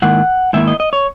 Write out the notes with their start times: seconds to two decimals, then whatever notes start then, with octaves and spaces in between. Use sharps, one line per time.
0.02 G#2 D#3 A#3 E4 F#5
0.53 G#2 D#3 A#3 E4 E5
0.67 D#5
0.80 D#5
0.93 C#5